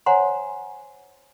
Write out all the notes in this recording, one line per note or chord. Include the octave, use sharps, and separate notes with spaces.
C5 C#5 F#5 G#5 A#5 C6